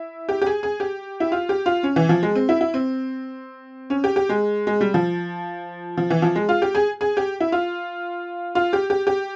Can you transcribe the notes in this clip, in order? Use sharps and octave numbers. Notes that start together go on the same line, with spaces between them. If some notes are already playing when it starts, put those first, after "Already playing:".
Already playing: E4
G4
G4
G#4
G#4
G4
E4
F4
G4
F4
C#4
E3
F3
G#3
C4
E4
E4
C4
C#4
G4
G4
G#3
G#3
G3
F3
F3
E3
F3
G#3
F4
G4
G#4
G#4
G4
E4
F4
F4
G4
G4
G4